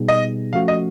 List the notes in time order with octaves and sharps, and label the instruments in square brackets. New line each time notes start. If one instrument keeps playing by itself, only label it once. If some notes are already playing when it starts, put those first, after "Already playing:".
Already playing: [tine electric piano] B2 G3 B3 D#4 G#4
[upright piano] D#5
[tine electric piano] F3 A3 C#4 F#4 [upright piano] F5
[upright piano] D#5